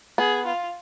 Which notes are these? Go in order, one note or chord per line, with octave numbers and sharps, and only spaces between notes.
B3 G#4
F4